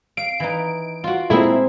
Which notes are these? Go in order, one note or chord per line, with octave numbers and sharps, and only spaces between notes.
F5 D7
E3 D#4
F4 F#4
A#2 G#3 A3 C4 D#4 E4 G#4